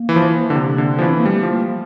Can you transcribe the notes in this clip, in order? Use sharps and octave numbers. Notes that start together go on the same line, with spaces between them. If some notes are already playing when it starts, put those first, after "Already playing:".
Already playing: A#3
E3
F3
E3
D3
C3
D3
F3
E3
C4
A#3
G3 A3
F3
A#3